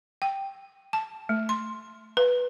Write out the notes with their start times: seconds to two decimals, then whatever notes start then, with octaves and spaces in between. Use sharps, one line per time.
0.22 G5
0.93 A5
1.29 A3
1.49 C6
2.17 B4